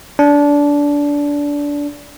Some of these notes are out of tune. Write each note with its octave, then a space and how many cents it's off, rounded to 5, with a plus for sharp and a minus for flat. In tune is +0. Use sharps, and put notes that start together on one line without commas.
D4 -20